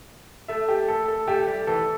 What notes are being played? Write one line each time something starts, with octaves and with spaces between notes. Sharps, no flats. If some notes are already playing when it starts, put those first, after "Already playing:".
A3 E5
G4
A4
A4
A3 G4
G3
E3 A4